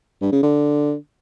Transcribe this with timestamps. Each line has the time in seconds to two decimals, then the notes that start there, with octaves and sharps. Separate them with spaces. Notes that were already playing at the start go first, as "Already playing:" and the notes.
0.22 G2
0.32 C#3
0.43 D3